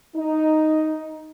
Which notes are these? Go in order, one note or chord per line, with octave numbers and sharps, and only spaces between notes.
D#4